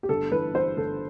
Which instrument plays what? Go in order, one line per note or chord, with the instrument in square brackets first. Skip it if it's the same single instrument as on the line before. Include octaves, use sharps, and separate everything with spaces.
[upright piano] G4
G1 A4
E3 B4
E3 C5
G1 A4